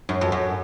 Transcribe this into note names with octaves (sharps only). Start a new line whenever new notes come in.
F#2
F2
F#2